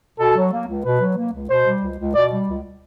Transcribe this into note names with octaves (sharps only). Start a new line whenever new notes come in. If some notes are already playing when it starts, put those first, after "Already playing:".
B2 A4
F#3
A#3
C#2
B2 B4
F#3
A#3
C#2
B2 C5
G3
C#2
C#2
B2 D5
G3
C#2